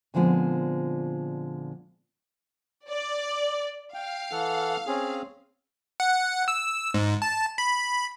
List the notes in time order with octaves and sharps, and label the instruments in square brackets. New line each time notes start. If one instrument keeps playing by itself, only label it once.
[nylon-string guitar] A#2 D3 F3 G#3 B3 C4
[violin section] D5
[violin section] F5 [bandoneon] G5
[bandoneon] E3 A4 F#5
C4 C#4 G#4
[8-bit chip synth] F#5
E6
G#2
A5
B5